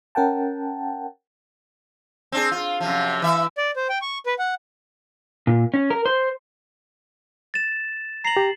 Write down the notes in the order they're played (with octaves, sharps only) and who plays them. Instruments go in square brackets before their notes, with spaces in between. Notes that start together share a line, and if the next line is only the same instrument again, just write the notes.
[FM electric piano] C#4 A#4 F#5 G5 A5
[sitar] C4 D4 G#4
F4
F#2 C3 F3
E3 E5
[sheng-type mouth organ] D5
C5
G5
C#6
B4
F#5
[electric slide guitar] A#2
C#4
A#4
C5
[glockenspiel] A6 E7
[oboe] A#5 [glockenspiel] C7 F#7
[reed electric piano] G4